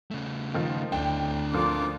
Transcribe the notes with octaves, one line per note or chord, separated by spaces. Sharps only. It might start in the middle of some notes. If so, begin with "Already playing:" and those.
C#3 A3
D#3 F3
D2 D4 E4 G5
A#2 D3 F3 F4 D6